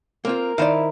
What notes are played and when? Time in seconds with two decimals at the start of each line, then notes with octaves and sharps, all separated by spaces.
0.25 A#3 C4 F4 A#4
0.58 D#3 E4 C5 D5 F5